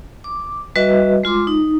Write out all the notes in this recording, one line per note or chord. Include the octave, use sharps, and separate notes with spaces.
D6
G3 F#4 B4 D#5 E5
G#3 F4 C6 D6
D#4